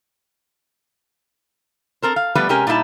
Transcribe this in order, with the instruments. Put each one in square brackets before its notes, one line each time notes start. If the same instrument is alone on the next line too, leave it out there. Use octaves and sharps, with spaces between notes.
[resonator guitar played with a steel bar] C4 A4 A#4 C5
F5
F3 G3 A3 B3 B4 D5
C3 G#3 C#4 G4 A#4 G#5
A#2 G3 D#4 E4 A5